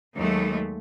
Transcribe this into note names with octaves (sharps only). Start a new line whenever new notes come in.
D#2 F#3 G#3 A3